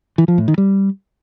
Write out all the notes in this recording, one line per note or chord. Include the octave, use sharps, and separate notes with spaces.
E3
F3
A2
D#3
G3